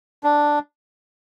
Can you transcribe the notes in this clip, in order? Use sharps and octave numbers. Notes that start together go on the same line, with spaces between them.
D4